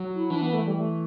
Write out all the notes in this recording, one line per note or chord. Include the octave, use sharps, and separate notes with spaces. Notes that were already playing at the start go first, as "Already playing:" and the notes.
Already playing: F#3
E4
E3 D4
B3
A3
G3
A3